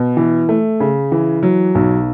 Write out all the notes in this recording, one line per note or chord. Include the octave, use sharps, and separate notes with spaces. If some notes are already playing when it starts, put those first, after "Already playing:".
Already playing: B2
E3
A3
C#3
E3
F#3
B1